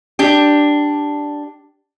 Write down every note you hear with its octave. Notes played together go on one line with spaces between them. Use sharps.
D4 G4